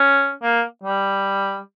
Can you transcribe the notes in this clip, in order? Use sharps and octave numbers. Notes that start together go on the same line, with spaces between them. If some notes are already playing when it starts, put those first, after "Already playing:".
Already playing: C#4
A#3
G3